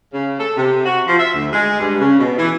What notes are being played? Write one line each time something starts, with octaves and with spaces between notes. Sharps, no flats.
C#3
A4
C3
F#4
F3
E5
D2
G#3
G2
C#3
B2
E3